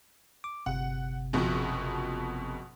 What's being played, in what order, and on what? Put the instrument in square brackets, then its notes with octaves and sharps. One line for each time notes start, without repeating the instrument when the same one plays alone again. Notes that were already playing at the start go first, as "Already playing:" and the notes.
[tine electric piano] D6
[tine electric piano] G1 C3 [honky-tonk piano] F#5
[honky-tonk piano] F#1 F2 B2